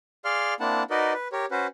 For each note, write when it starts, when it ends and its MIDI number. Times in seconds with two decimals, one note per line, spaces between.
0.25 0.54 68
0.25 0.54 74
0.25 0.54 77
0.25 0.54 84
0.25 0.54 89
0.60 0.83 58
0.60 0.83 60
0.60 0.83 62
0.60 0.83 64
0.60 0.83 78
0.60 0.83 81
0.90 1.13 63
0.90 1.13 66
0.90 1.13 70
0.90 1.13 71
0.90 1.13 74
0.90 1.13 75
1.13 1.28 71
1.32 1.46 67
1.32 1.46 70
1.32 1.46 73
1.51 1.67 61
1.51 1.67 66
1.51 1.67 71
1.51 1.67 72